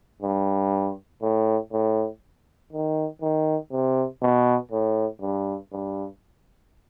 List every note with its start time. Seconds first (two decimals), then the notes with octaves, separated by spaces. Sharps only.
0.22 G2
1.22 A2
1.72 A2
2.73 D#3
3.22 D#3
3.72 C3
4.22 B2
4.72 A2
5.21 G2
5.72 G2